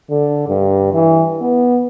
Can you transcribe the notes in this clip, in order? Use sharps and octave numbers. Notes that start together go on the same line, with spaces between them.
D3
G2
E3
B3